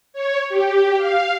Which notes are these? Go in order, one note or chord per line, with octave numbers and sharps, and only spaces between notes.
C#5
G4
F5